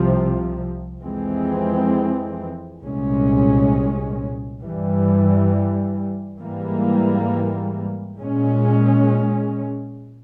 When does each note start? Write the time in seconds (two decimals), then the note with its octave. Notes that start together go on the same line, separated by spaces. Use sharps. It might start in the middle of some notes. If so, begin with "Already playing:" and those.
Already playing: C2 C3 F3
1.01 F2 E3 G#3 C4
2.81 C2 A#2 G#3 C#4
4.59 G2 E3 G3
6.38 G#2 E3 G3 A#3
8.18 A#2 G#3 C#4